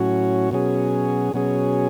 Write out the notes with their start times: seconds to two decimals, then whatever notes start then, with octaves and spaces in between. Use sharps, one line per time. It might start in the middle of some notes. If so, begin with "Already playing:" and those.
Already playing: A2 F#3 C#4 F#4
0.51 B2 F#3 C#4 G#4
1.34 B2 F#3 C#4 G#4